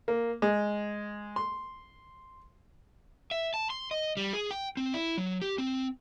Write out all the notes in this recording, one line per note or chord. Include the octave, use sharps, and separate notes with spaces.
A#3
G#3
C6
E5
A5
C6
D#5
G3
G#4
G5
C4
E4
F#3
G4
C4